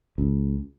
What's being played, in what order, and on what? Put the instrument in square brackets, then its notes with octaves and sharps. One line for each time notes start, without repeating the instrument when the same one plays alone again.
[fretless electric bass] C#2